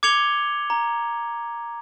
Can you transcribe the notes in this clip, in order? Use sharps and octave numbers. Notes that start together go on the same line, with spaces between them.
D6 G#6 C#7 F7 G7
A#5